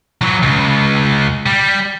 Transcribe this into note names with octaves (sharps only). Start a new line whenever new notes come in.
E3 F#3
C#2
G3